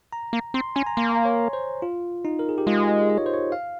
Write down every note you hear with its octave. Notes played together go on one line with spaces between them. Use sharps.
A#5
A#3
C4 C6
C#4 G#5
A#5
A#3 C6
C#5
C5
F4
D#4
A#4
G#4
G4
G#3 F4
D#5
C#5
C5
C#5
F5